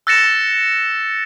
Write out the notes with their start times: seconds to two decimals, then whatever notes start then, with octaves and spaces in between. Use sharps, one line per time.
0.07 E6 F#6 A6 A#6 C#7 E7